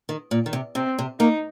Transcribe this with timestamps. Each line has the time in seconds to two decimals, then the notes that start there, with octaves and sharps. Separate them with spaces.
0.09 D#3
0.31 A#2
0.46 D#3
0.53 C3
0.75 C3 C4
0.99 C3
1.20 A#3 D#4